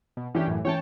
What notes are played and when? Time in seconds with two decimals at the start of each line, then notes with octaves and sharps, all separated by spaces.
0.17 B2
0.35 E3 C#4 D4 G4
0.47 F#2 A2
0.65 E3 C#4 C#5 G5 A5